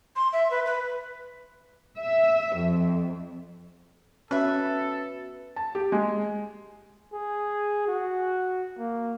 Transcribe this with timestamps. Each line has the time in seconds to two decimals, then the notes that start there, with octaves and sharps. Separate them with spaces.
0.16 C6
0.33 E5
0.51 B4
0.66 B4
1.98 E5
2.56 F2
4.31 B2 C#4 A4 B4 E5
5.56 A5
5.75 G4
5.92 G#3
7.13 G#4
7.88 F#4
8.78 A#3